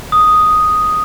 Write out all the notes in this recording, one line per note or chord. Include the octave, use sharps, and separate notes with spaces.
D#6